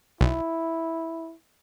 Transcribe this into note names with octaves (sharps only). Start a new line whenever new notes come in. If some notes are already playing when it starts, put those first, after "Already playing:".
B1 E4